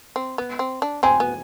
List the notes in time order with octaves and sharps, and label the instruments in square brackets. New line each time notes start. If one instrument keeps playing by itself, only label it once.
[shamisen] C4
B3
C4
D4
[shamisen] C4 [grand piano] G#5
[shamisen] B3